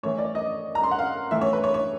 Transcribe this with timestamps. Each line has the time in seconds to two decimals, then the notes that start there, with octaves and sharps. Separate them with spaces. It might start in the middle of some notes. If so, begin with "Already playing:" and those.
0.03 A2 E3 C#5
0.18 D5
0.35 D#5
0.75 A#5
0.83 C6
0.91 F#5
0.99 F5
1.31 A2 E3 E5
1.41 C#5
1.53 B4
1.64 C#5
1.74 C#5